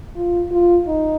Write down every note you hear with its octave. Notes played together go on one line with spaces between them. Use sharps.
F4
F4
D#4